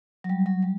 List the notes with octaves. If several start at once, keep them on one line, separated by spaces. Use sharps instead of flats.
F#3
G3
F#3
G3